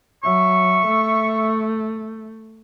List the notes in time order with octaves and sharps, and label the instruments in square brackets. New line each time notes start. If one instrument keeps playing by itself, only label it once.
[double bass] F#3 [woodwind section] E5 C#6
[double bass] A3